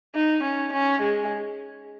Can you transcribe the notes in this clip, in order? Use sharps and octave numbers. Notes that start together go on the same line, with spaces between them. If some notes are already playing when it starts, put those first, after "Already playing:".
D#4
C#4
C#4
G#3